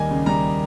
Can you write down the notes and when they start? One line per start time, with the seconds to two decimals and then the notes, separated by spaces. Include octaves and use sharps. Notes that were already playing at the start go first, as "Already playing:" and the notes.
Already playing: D#2 G3 A#3 D#5 G#5
0.11 C#3
0.26 G3 A#5